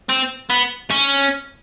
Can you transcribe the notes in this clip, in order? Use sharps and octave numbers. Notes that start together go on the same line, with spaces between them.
C4
B3
C#4